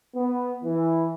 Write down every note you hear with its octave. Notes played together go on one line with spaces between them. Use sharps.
B3
E3